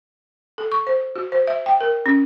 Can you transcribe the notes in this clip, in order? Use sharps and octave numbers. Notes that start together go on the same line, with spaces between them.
A4
C#6
C5
F#4
C5
E5
G5
A#4
C#4